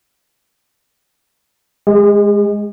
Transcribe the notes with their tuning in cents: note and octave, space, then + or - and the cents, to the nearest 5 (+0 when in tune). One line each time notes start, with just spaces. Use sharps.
G#3 +0 G#4 -40